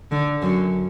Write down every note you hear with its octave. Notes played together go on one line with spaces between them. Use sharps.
D3
F#2 F#3